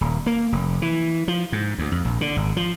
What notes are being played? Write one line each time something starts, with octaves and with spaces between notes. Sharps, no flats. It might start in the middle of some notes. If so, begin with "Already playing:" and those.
D#1
A#3
F1
E3
F3
G#2
D2
F2
A#1
D3
G#1
F3